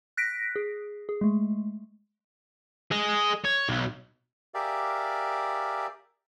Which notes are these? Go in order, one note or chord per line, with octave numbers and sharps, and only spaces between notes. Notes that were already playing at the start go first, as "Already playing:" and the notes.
F#6 A#6 B6 D7
G#4
G#4
G#3 A3
G#4 D#5
C#5
B1
G4 G#4 A#4 D5 E5 F5